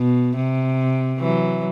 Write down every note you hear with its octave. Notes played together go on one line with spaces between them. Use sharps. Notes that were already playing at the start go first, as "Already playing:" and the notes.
Already playing: B2
C3
E3 F#3